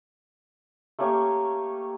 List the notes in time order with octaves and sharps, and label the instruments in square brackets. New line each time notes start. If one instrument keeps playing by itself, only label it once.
[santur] A3 A#3 C#4 G4